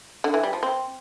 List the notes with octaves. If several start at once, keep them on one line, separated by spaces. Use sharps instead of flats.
D3
E3
G3
F3
C4